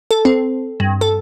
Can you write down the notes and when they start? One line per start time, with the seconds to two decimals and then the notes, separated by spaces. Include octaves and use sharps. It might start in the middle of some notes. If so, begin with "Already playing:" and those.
0.11 A4
0.25 C4
0.80 G2
1.01 A4